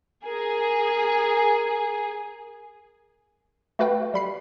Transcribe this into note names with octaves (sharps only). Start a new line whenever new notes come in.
G#4 A#4
A3 F#4 B4 F5 G5
G3 B5 C7